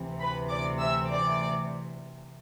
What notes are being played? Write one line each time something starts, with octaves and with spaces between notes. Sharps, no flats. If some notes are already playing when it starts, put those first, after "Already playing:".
Already playing: D2 C3 E3
B4 B5
D5 D6
E5 E6
D5 D6